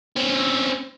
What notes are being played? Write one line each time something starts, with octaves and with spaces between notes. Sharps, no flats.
C4 C#4